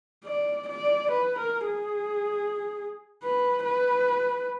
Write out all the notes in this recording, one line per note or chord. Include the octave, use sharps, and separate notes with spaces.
D5
D5
B4
A#4
G#4
B4
B4